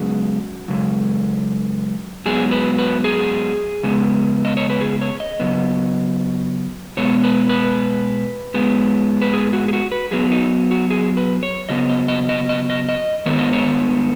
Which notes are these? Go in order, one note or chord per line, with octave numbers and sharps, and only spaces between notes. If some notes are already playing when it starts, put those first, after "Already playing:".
Already playing: F#2 C#3 G#3 B3 F#4
F#2 C#3 G#3
G#2 F#3 B3 G#4
B4
B4
G#4
C#3 G#3 B3
D#5
C#5
B4
G#4
C#5
D#5
C#3 F#3 B3
B2 G#3 B3 C#5
B4
B4
G#2 G#3 B3
B4
G#4
F#4
G#4
F#4
B4
F#2 F#3 B3 G#4
D#4
F#4
G#4
B4
C#5
C#3 F#3 B3 D#5
D#5
D#5
D#5
D#5
D#5
D#5
G#2 D#3 B3 C#5
D#5
C#5